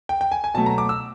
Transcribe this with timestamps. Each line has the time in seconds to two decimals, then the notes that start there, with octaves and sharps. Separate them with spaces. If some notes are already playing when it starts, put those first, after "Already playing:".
0.09 G5
0.21 G5
0.32 G#5
0.44 G#5
0.54 B2 F#3 A3 A5
0.66 A#5
0.78 D6
0.89 E6